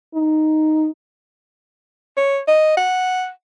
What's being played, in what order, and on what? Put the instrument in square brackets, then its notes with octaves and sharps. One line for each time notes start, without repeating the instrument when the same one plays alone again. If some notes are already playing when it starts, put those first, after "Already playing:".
[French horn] D#4
[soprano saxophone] C#5
D#5
F#5